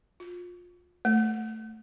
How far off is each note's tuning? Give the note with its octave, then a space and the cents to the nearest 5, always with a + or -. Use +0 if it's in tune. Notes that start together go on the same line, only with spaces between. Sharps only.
F4 +25
A3 +5